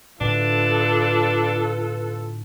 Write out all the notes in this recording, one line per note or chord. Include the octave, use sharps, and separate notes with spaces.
A2 D3 D4 F4 A4 B4